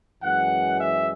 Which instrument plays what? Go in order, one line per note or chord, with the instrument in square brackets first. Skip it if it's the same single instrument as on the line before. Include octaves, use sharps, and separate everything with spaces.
[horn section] F#2 E3 G#3 F#5
E5